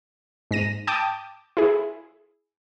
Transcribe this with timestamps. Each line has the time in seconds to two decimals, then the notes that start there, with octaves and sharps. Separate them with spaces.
0.51 G#2 A#6 D#7
0.87 G5 A5 D6 D#6
1.57 E4 G#4